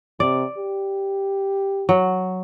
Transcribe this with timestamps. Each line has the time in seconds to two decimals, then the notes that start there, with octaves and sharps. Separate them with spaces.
0.20 C3 D5
0.58 G4
1.89 F#3